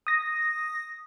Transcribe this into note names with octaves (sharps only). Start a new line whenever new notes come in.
D#6 A#6